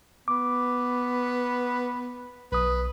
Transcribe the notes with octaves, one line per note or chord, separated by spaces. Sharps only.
B3 D6
B1 B4 D#6